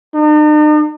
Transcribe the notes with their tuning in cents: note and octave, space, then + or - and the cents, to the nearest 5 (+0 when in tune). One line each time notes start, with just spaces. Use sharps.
D#4 -45